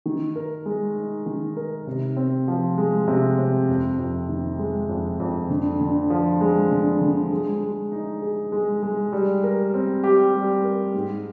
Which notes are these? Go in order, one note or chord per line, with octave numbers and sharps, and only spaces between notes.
D#3
A#4
G#3
D#4
D#3
A#4
C3
C4
F3
G#3
C3
C4
F2
F2
D#3
G#3
F2
F2
D3
D3
F3
G#3
D3
D3
G#3
G#3
D#4
G#4
G#3
G#3
G3
A#4
C4
G4
G3
A#4
G#2